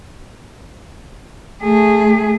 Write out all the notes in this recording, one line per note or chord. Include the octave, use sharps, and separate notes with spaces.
A3 G#4